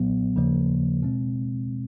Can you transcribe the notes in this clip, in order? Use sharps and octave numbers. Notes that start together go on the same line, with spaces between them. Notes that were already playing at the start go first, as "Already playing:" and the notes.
Already playing: B1 A#2 F#3 B3
D#2 C#3 F3 A#3
B2 G#3 C4